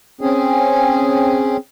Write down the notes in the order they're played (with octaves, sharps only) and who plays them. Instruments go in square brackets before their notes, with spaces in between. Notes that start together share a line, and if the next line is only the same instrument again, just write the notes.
[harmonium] C4 C#4 G#4